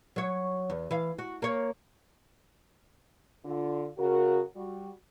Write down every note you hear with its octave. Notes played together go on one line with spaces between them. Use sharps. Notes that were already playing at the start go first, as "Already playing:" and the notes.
F#3 C#5
E2
E3 F5
F#4
A#3 C#5
D3 F4
C#3 F#4 A#4
G3 F#4